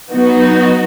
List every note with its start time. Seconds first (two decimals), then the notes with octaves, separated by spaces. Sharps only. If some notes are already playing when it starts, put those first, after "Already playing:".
0.12 F#3 B3 D#4 F#4